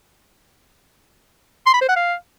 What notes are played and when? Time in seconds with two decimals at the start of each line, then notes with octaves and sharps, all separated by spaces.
1.66 C6
1.74 B5
1.81 C5
1.89 F#5
1.96 F5